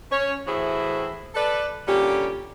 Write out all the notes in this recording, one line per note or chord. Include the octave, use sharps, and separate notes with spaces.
C#4 C#5
A2 E3 E4 F#4 G#4 C5
A4 B4 D5
A#2 D3 G3 C#4 G4